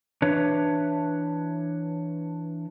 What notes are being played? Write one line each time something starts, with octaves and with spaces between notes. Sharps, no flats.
E3 D4 B4 C#5